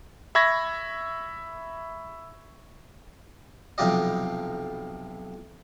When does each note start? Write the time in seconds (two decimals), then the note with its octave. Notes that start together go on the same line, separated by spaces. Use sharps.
0.35 E5 B5 C#6 G#6 A#6
3.78 B1 C3 F3 F4 G4 D#5